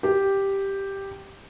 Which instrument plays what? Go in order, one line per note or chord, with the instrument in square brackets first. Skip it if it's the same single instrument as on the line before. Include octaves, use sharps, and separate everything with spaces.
[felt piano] G4